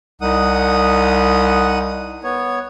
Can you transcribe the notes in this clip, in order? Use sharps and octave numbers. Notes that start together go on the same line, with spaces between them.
C2 D#4 F#5 D#6
B3 C#5